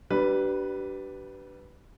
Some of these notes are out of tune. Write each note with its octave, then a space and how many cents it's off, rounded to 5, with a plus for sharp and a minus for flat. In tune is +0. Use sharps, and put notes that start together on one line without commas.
G3 -30 D4 +0 B4 +0